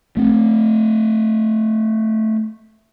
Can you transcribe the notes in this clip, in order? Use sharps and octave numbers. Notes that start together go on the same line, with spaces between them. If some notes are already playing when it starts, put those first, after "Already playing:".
A3 C4